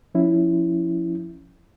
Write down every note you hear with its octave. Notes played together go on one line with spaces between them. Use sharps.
F3 C#4 E4